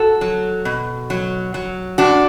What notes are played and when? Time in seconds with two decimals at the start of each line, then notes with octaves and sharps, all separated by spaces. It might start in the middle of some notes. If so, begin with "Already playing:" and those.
Already playing: F#4 A4
0.21 F#3
0.65 B2
1.10 F#3
1.54 F#3
1.98 A2 D4 F#4